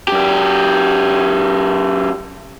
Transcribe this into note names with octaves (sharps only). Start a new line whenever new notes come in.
F#2 G4